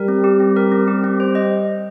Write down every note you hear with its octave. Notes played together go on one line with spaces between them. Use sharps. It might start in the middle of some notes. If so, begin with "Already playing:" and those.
Already playing: G3 A#4
C4
G4
C4
A#4
C4
G4
C4
C5
D#5